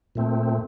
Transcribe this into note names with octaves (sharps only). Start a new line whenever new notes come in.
A#2 A3 C4